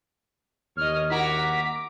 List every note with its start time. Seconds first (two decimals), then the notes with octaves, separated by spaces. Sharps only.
0.77 D#2 C#5 D#5 F6
1.10 E4 F#4 A#4 A#5 D6 B6